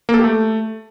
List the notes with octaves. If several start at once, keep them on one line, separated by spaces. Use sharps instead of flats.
A#3
A4
G4
A3